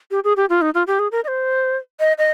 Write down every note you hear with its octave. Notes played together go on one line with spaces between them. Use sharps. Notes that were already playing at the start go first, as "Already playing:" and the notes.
G4
G#4
G4
F4
D#4
F4
G4
G#4
A#4
D#5
C5
D#5
D#5